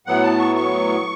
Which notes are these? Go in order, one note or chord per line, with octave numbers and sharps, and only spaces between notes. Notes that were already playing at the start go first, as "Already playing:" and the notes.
A2 F#3 B3 F#5
A5
C#6
C#6